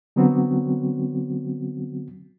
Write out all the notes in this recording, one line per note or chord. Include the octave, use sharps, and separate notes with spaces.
D3 F#3 B3 C4 F#4